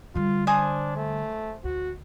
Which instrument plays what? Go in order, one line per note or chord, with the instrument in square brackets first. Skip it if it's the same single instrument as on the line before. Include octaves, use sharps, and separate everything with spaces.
[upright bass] D3 G3 [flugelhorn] F4
[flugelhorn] D4 [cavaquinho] C5 G#5 D#6
[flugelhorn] A3
[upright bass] D2 [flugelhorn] F#4